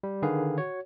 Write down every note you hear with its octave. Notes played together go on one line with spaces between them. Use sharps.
G3
D3 D#3 G#4 B4 F5
F#4 C#5